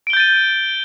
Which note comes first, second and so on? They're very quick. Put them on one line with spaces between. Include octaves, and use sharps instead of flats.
D7 G7 G6 A6 D#7